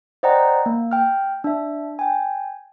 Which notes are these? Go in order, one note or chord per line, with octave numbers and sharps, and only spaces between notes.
C5 D5 D#5 F#5 G5 A#5
A#3
G5 F6
D4 E5
G5 G#5